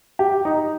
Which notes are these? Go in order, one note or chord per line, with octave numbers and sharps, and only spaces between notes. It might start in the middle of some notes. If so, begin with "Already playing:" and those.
G4
D#4